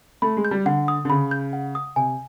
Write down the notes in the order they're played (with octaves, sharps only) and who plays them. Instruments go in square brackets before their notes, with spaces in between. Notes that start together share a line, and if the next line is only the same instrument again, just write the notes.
[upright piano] A3 [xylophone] B5
[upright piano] G#3
[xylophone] G6
[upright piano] G3
[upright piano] D3 [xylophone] F#5
[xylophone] D#6
[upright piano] D3
[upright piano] C#3 [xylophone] B5
[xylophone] G6
F#5
D#6
[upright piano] C3 [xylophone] G#5